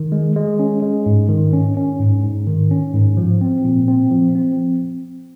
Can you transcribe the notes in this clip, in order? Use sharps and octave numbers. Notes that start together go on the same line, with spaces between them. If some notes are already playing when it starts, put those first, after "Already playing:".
Already playing: D#3
G#3
G#3
C#4
G#3
G#2
D#3
C#4
C#4
G#2
G#2
D#3
C#4
G#2
F3
C4
A#2
C4
F3
C4